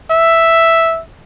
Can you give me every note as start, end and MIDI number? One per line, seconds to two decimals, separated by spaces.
0.11 1.01 76